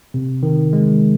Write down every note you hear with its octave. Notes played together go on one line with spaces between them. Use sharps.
C3
D#3
G#3